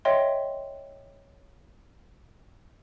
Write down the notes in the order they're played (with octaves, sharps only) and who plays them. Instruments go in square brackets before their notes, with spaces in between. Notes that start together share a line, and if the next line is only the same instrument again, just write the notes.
[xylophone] C#5 D#5 E5 G5 C6